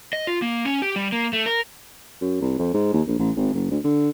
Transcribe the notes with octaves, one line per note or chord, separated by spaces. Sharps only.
D#5
F4
A#3
C#4
G4
G3
A#3
A3
A#4
F#2
C2
F2
G#2
D#2
A#1
A1
G#1
F#1
D2
D3